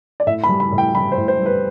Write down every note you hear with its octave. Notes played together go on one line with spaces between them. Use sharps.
D5
A2 E5
B5
G3
B5
A2
G5
G3 B5
C5
A2
C5
G3
B4